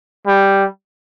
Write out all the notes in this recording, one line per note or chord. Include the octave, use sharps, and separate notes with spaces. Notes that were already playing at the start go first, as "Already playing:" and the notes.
G3